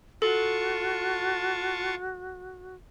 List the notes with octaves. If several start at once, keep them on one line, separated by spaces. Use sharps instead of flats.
F4 F#4 A4 A5 C#6